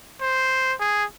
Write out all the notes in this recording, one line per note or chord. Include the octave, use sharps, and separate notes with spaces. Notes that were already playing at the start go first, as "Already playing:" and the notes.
C5
G#4